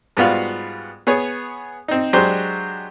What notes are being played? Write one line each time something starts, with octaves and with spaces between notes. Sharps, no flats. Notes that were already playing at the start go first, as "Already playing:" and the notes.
G#2 G3 B3 F4 F#4 F5
B3 G#4 C#5
C4 D#4
F#3 G#3 D4 G4 C5